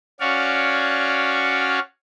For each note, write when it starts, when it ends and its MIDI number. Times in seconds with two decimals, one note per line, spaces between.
0.20 1.79 61
0.20 1.79 66
0.20 1.79 73
0.20 1.79 74
0.20 1.79 77